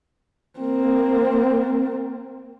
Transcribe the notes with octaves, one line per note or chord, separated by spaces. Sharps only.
A#3 C4